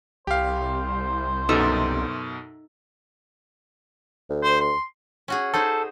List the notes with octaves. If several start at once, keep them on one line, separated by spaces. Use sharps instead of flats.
C2 G4 C5 F5
F#2 B2 D#4 A4 E5
D2
C5
C6
C#4 F#4 G#4
D#4 G#4 A4 C5